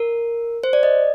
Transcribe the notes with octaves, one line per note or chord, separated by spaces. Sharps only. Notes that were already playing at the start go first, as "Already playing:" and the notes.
Already playing: A#4
C5
D5
D#5